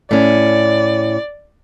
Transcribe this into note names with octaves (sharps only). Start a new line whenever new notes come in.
A2 C#4 D5